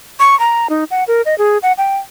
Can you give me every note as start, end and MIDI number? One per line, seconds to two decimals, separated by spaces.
0.20 0.38 85
0.40 0.67 82
0.70 0.84 63
0.91 1.04 78
1.08 1.22 70
1.26 1.37 75
1.38 1.58 68
1.63 1.73 78
1.78 1.97 79